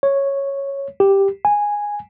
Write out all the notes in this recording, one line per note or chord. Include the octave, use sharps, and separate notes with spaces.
C#5
G4
G#5